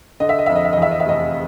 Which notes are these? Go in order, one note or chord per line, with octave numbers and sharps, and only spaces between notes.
D3 D#5
E5
D#5
F2 E5
D#5
E5
D#5
E2 E5
D#5
E5
F1 D#5